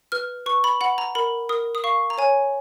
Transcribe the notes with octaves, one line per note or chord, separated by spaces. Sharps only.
B4 F6
B4 C#6
B5
F#5 B5
A#5
A#4 B5
A#4 D#6
D#6
F5 C#6
A#5
C#5 G#5